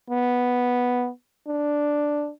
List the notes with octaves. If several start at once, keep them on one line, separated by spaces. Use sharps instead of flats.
B3
D4